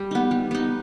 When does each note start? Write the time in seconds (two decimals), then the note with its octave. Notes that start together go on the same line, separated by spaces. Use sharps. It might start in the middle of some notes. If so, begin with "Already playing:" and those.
Already playing: G3
0.11 B3 D#4
0.31 G3
0.51 B3 D#4